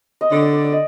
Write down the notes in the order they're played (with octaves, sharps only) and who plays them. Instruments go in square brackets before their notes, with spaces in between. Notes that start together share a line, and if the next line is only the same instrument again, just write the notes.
[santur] D#5
[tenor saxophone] D3 [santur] D5
[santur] D5
D5
D5
D#5